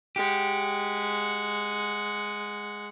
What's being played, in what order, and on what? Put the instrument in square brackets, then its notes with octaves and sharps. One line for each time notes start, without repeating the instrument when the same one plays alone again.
[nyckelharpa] G#3 F#5 [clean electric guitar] G4